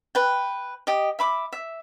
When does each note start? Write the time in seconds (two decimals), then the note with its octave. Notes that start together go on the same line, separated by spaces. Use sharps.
0.15 B4 G5
0.87 G4 D#5
1.19 E5 B5 D6
1.53 E5